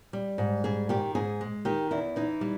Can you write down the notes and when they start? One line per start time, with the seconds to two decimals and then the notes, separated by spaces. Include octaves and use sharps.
0.13 G3
0.38 G#2
0.64 G3 G#4
0.89 D#3 G4
1.15 G#2 G#4
1.41 G#3
1.65 D#3 G4
1.91 E2 E4
2.16 E3 D#4
2.41 G3